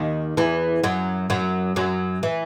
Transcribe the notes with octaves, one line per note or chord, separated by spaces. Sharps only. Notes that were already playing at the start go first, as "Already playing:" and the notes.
Already playing: D#2 D#3
E2 E3
F#2 F#3
F#2 F#3
F#2 F#3
E3